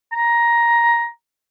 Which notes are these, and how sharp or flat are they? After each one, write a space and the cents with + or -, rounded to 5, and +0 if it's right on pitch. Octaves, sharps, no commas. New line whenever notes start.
A#5 +10